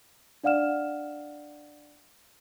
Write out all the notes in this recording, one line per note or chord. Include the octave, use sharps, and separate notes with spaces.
D4 D5 F5 F#5 F6 E7